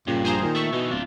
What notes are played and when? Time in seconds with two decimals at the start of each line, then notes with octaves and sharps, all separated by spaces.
0.07 G2 A#2 C#3
0.25 A#1 G#4 C5 A#5
0.42 A#2 D#3
0.55 A3 E5 C#6
0.73 B2 E3 D#4
0.91 D1 D4 F4